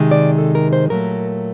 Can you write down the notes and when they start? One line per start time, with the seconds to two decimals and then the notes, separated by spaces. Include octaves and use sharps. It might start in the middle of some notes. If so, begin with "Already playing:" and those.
Already playing: C3 D#3 G#3
0.11 D5
0.38 A4
0.55 A#4
0.73 C5
0.90 A#2 F#3 A3 A#4